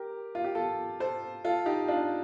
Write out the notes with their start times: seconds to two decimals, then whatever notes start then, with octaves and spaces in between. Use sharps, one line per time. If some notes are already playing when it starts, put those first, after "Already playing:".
Already playing: G4 A#4
0.35 F4
0.44 G4
0.55 F4 A4
1.00 A4 C5
1.44 F4 A4
1.66 D#4 G4
1.88 D4 F4